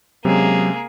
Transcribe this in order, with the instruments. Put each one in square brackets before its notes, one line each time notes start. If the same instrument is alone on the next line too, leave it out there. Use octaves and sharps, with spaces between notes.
[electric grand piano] C3 G#3 C#4 [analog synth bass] F#3 [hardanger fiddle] A#3 G#4